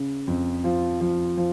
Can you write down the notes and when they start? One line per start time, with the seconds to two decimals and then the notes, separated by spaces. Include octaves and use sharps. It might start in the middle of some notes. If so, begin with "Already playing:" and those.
Already playing: C#3
0.28 F2
0.64 F3
1.01 F3
1.37 F3